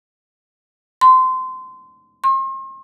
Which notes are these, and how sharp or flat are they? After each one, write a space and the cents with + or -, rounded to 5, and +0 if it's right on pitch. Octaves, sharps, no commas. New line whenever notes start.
C6 -20
C6 +40